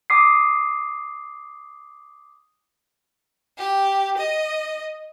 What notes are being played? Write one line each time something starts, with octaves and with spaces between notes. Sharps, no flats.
D6 D#6 C7
G4
D#5